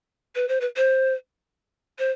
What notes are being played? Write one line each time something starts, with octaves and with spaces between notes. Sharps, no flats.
B4
C5
B4
C5
C5